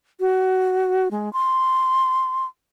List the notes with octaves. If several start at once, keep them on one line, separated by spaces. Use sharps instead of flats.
F#4
G#3
C6